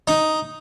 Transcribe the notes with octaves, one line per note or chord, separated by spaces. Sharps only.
D#4